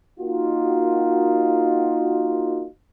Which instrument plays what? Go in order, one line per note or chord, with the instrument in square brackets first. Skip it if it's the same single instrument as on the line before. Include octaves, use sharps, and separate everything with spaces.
[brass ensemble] A#3 D#4 F4 F#4